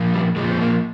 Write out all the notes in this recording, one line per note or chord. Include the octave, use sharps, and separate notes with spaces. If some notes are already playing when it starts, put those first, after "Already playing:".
Already playing: A#2 F3
G3
A#2 F3 G#3
C4
A#3